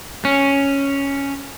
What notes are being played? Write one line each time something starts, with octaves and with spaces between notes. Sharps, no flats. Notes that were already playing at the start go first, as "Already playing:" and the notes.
C#4